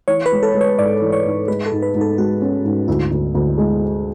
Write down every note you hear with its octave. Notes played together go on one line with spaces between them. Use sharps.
E3 C#5
B4
G#3
A4
G#3
C#5
G#2 D5
E3
C#5
G#2
G#3 B4
A4
G#2
B4
G#2
A4
G#3 F#4
C#4
G#2
D2 E4
D2
D2
G#3